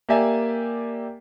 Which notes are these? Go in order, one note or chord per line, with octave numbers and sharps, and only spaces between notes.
A#3 G4 D5 E5 G#5